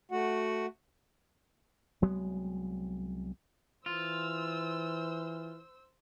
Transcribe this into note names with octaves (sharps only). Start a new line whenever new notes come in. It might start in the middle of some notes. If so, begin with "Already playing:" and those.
A3 F#4 F#5
C2 F#3 G#3 B3
E3 F4 C5 E6